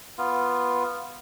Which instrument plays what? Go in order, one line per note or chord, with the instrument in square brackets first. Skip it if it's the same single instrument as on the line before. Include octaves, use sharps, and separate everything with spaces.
[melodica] B3 F4